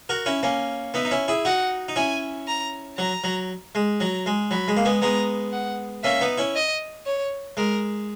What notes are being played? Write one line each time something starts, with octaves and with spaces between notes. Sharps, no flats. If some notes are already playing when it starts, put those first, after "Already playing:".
F#4 A#4
C#4 E4
A#3 C#4
B3 D#4 E5
D#4
C#4 E4
E4 G#4
D#4 F#4 F#5
D#4
C#4 E4 G#5
A#5
F#3 A#5
F#3
G#3
F#3 A#5
G#3
F#3 B5
G#3
A#3
G#3 B3
G#3 B3 A#5
F#5
A#3 C#4 E5
B3 D#4
C#4 E4
D#5
C#5
G#3 A#4